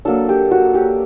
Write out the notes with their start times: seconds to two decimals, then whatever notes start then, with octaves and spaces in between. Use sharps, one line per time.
0.05 F#3 A#3 D4 A4
0.29 G4
0.51 F#4
0.74 G4